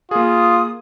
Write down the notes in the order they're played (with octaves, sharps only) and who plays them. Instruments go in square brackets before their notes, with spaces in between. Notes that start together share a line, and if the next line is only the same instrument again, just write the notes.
[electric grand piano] A#3 G#4 [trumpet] F4 [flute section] D#6